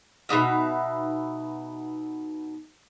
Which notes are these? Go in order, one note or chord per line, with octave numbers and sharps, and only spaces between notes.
B2 F#3 D#4 E5